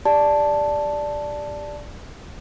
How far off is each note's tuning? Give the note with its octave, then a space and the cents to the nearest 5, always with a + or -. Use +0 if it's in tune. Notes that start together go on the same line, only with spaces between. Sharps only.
G4 +25 D5 +0 A5 +0